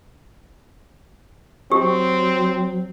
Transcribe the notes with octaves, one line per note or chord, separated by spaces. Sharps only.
F#3 C4 G4